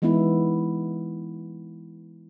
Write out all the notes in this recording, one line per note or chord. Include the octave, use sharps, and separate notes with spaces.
E3 G#3 B3 D#4 E4